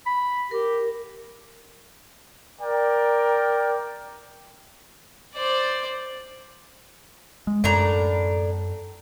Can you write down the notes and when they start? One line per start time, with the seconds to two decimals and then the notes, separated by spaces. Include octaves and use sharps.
0.06 B5
0.51 G4 A#4
2.62 A#4 D5 G5
5.34 C5 D5
7.47 G#3
7.64 F#2 A2 D4 A#5